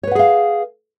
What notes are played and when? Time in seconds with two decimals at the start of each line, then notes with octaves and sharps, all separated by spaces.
0.03 C#5
0.07 B4
0.11 F#5
0.15 G#4
0.19 F5